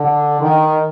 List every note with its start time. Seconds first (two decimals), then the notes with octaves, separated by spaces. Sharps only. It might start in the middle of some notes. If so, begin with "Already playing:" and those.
Already playing: D3
0.41 D#3